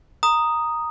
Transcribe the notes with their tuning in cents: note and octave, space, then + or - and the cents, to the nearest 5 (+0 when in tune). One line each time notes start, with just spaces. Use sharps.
A#5 +0 D#6 +0